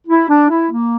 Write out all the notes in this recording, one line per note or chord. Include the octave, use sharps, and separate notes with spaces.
E4
D4
E4
A#3